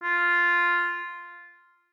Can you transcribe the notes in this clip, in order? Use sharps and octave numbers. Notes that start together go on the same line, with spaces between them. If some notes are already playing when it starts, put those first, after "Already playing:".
F4